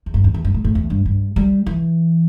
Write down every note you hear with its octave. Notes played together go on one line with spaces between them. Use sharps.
E2
G2
E2
E2
G2
A2
A2
E2
G2
G2
G3
E3